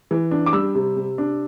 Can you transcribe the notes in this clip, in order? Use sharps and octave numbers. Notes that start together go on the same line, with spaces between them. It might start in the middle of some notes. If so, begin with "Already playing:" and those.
E3
D4
D6
G3 E6
C3
C3
D4